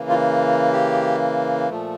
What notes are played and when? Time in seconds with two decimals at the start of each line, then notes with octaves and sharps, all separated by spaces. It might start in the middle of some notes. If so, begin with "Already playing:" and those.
Already playing: C#3 E3 A#3
0.09 F4
0.73 G4
1.70 A#2 F3 A3